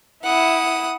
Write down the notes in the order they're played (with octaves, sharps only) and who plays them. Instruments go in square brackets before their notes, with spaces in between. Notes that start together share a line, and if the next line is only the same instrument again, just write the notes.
[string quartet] E4 [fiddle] F#5 D#6